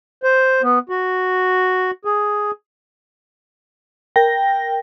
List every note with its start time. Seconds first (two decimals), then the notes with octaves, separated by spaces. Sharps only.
0.23 C5
0.63 B3
0.89 F#4
2.05 G#4
4.16 A#4 G5 A#6